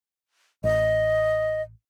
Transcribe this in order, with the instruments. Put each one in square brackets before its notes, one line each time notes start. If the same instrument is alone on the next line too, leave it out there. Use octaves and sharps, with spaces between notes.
[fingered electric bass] A1 [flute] D#5